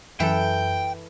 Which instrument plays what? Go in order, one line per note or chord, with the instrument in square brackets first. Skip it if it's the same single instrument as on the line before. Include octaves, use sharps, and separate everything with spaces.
[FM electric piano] F#2 [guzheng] E3 A4 [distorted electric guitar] G5